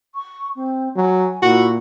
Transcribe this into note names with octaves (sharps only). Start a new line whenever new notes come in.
C#6
C4
F#3 G#5
A#2 E4 F#4